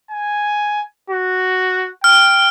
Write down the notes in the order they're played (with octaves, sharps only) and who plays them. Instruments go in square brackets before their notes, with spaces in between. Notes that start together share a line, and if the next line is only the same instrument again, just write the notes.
[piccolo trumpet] G#5
F#4
[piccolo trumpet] G5 [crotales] F6